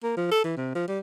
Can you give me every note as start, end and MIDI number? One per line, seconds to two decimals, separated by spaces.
0.03 0.15 58
0.17 0.29 53
0.31 0.40 69
0.44 0.55 52
0.57 0.71 48
0.75 0.87 53
0.88 0.99 55